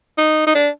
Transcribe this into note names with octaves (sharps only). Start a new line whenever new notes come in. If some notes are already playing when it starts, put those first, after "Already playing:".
D#4
D#4
D4